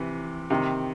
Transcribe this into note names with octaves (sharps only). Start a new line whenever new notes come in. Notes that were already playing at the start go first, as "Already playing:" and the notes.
Already playing: C3 E3
C3 D#3